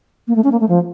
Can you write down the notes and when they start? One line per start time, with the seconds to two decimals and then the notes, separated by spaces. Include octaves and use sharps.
0.28 A#3
0.36 A3
0.44 C#4
0.52 A#3
0.60 A3
0.69 F3